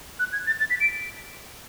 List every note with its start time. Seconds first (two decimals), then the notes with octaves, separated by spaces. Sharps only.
0.19 F#6
0.32 G#6
0.46 A6
0.60 A6
0.70 B6
0.80 D7